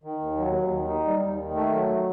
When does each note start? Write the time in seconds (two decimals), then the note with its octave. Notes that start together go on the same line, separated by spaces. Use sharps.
0.04 D#3
0.20 D#2
0.37 F#3
0.54 D#2
0.72 D#3
0.87 D#4
1.05 G3
1.21 D#2
1.39 D#3
1.55 A3
1.72 F#3